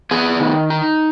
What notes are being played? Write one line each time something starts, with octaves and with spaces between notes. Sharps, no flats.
B3 G#4
D#3
D#4